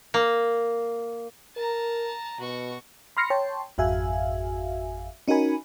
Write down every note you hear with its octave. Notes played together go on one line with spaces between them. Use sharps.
A#3
A#4 A5 A#5
B2 F#4 C#6
B5 C6 F6 A#6 C7 C#7
C#5 G5 A5 C6
G#1 F2 F#4 E5 F5 G#5
C#4 D#4 F#4 A#4 G#5 B5